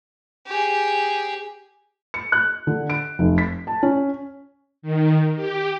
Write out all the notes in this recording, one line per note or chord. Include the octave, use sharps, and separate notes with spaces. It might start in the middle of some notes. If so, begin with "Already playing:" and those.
G4 G#4
C#7
F#6
D3
D7
F1
B6
A5
C#4
D#3
G4